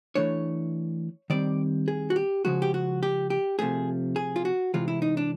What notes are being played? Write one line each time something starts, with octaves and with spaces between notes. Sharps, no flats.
E3 A3 D4 C#5
D#3 G3 C4 D5
G#4
F#4
G4
C#3 F3 G#3 F#4
G4
F#4
G4
G4
C3 F3 A3 G#4
G#4
F4
F#4
C3 E3 G#3 C4 F4
E4
D#4
D4